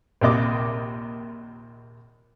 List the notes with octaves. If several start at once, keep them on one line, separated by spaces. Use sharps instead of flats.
A#1 D#2 C3 D#5 D6